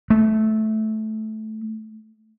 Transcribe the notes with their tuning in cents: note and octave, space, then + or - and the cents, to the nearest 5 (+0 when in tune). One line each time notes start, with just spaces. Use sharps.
A3 -15